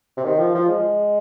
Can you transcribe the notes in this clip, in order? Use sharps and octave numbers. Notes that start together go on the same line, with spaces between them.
C3
D#3
F3
F3
G#3